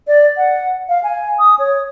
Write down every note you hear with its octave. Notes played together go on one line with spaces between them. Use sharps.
D5
F#5
F5
G#5
D#6
C#5